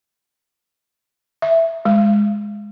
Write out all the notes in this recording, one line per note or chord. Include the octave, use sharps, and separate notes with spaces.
E5
G#3